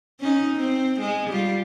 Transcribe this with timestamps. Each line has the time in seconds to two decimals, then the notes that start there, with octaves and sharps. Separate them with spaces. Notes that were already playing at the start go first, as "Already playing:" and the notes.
0.20 C#4 D#4
0.56 C4
1.00 G#3
1.30 G3 F4